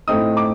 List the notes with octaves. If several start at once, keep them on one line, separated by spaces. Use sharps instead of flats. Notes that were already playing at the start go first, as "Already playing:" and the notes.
A2 A3 C4 D#4 D#6
D6